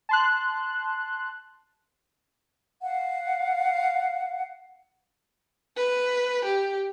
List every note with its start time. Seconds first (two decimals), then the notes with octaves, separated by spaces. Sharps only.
0.09 A5 C6 F#6
2.81 F5 F#5
5.77 B4
6.45 G4